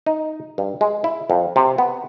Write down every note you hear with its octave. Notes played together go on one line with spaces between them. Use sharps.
D#4
G2
G#3
E4
F2
C3
B3